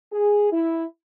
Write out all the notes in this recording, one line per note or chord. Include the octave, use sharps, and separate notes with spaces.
G#4
E4